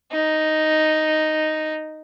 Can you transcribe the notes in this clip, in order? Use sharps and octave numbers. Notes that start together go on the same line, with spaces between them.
D#4